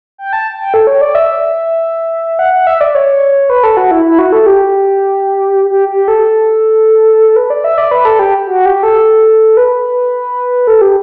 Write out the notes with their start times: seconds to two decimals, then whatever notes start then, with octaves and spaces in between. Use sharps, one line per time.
0.18 G5
0.33 A5
0.60 G5
0.74 A4
0.87 C#5
1.01 D5
1.15 E5
2.39 F#5
2.53 F#5
2.67 E5
2.81 D5
2.95 C#5
3.50 B4
3.63 A4
3.77 F#4
3.91 E4
4.05 E4
4.19 F#4
4.32 A4
4.46 G4
5.71 G4
5.89 G4
6.08 A4
7.36 B4
7.50 D5
7.64 E5
7.78 D5
7.91 B4
8.05 A4
8.19 G4
8.47 F#4
8.66 G4
8.83 A4
9.57 B4
10.67 A4
10.81 G4